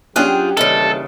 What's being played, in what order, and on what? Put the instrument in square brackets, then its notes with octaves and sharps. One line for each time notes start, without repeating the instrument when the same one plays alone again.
[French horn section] F#3 G4 [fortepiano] C#4 D4 F#6 [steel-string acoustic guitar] F4 G#4 G5
[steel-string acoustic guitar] D#2 A#2 C#3 [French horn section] E3 G3 D5 [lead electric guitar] A4